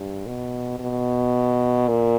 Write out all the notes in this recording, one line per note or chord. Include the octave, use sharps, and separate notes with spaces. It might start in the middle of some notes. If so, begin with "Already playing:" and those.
Already playing: G2
B2
B2
A#2